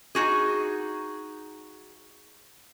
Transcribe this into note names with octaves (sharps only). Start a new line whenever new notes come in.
D#4 F#4 G#4